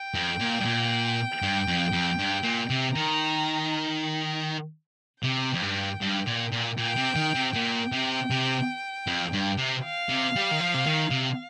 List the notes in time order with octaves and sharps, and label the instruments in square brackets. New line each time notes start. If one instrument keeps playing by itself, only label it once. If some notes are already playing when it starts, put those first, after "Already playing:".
Already playing: [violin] G5
[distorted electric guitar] F2
A#2
G2
A#2
G2
F2
F2
G2
A#2
C3
[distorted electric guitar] D#3 [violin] A#5
[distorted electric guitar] C3 [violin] G5
[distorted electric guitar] F2
G2
G2
A#2
A#2
[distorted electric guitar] A#2 [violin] G5
[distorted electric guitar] C3
D#3
C3
[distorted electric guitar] A#2 [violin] G5
[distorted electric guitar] C3
C3
F2
G2
C3
[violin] F5
[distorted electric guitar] C3
G3
D#3
F3
C3
D#3
C3